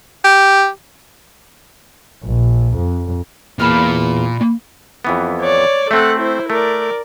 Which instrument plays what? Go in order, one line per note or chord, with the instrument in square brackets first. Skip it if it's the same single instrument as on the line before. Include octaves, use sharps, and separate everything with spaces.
[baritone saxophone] G4
[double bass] A#1
F2
[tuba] E2 [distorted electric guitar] A#2 [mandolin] A5 B5 F6
[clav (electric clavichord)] F2 E3 B3
[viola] C#5 D5
[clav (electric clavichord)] A3 C4 [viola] A4 F#5
[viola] E4 C5
[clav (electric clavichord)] A3 [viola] A#4 D5